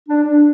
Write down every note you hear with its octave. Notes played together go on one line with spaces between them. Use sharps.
D4
D4